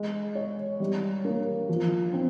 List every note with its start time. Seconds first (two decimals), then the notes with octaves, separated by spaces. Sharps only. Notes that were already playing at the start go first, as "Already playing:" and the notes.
Already playing: G#3
0.35 C#5
0.80 G3
1.25 A#3
1.69 F3
2.13 C4